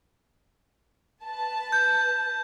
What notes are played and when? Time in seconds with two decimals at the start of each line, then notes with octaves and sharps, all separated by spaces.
1.25 B4 A5
1.72 G6